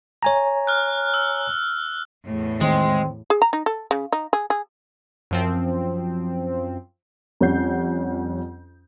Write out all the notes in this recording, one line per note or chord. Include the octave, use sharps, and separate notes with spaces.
C#5 G#5 A#5
F6 F#6
E6
E2 A2
D#3 G#3 C4
G#4
A#5
D#4
A4
C#3
D#4
G#4
G#4
F#2 F3 C4
F2 G3 C#4 F#5 G6 C7